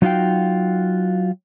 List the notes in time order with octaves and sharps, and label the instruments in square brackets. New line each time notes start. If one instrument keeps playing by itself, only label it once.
[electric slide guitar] F#3 D#4 F4 F#4 F5 G5